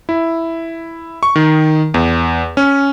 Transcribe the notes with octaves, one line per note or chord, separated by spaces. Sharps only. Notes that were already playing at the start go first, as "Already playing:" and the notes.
E4
C#6
D#3
E2
C#4